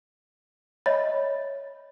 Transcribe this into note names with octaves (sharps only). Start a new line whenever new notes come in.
C#5 D#5 E5 B5 A6